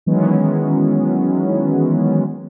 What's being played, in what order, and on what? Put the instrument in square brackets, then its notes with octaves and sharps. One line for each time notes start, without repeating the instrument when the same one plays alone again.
[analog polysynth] D#3 E3 F#3 G#3 B3 C#4